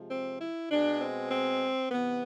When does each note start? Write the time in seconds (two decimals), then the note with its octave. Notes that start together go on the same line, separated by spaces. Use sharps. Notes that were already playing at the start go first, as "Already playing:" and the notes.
Already playing: C3 F3 G#3
0.11 C4
0.41 E4
0.71 B2 G#3 D4
1.01 C4
1.31 C4
1.91 C3 E3 B3